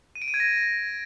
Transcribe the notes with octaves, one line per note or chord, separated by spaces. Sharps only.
D#7
D7
D#7
G#6
A#6